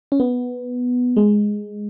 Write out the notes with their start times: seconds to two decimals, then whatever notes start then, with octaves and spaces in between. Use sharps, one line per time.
0.12 C#4
0.20 B3
1.16 G#3